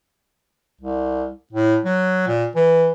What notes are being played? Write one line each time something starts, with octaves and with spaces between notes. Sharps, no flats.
C2
A2
F#3
A#2
E3